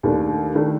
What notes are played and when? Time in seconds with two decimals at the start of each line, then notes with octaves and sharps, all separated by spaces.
0.03 D#2 D#3 A3 D4
0.55 D#3 A3 D4